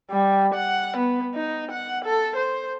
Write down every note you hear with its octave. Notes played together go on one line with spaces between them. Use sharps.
G3
F#5
B3
D#4
F#5
A4
C5